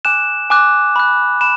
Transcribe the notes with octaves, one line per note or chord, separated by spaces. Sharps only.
G#5 D6 F#6 E7
G#5 D6 F#6
B5 F#6
B5 E7